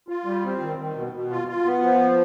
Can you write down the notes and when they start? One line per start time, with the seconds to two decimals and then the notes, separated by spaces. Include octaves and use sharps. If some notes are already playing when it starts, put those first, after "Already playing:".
0.08 F4
0.25 G3
0.44 C4
0.60 D#3
0.78 D#3
0.95 B2
1.13 B2
1.30 F4
1.48 F4
1.65 B3
1.83 F3